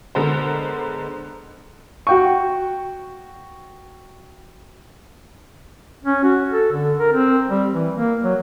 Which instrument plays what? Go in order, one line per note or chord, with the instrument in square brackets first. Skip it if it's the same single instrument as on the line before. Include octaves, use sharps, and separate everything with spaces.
[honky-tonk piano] D3 G#3 B3 A#4 C5
[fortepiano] F#4 G5 C#6
[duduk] C#4
F#4
A4
D3
A#4
C4
G3
E3
A#3
F#3